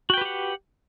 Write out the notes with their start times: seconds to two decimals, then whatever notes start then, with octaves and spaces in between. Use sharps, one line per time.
0.10 F#4
0.14 G5
0.17 B4
0.21 G4
0.25 F#5